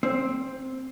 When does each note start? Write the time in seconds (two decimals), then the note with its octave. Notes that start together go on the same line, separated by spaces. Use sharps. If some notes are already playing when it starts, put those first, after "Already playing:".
0.03 C4